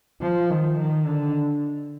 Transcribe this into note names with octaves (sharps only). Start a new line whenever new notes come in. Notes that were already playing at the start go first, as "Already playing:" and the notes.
F3
D#3
D#3
D3